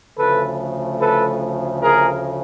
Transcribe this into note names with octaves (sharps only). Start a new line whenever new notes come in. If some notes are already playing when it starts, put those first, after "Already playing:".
D2 C#3 F3 A3 A4 B4
A4 B4
G#4 A#4